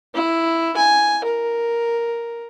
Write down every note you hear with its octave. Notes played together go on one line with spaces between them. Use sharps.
E4
G#5
A#4